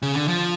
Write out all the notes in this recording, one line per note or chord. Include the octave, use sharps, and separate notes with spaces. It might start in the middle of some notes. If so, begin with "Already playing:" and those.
C#3
D3
F3